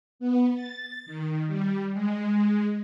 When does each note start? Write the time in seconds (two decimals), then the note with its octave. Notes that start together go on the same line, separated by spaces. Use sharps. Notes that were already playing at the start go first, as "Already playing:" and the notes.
0.20 B3
0.55 A6
1.06 D#3
1.47 G3
1.93 G#3